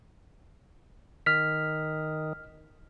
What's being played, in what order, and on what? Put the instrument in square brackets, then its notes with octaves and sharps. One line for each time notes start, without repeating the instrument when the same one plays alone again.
[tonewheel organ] D#3 [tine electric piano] F6 B6